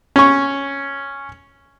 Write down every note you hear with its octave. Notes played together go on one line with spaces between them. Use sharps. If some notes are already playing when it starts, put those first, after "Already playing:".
C#4 C#6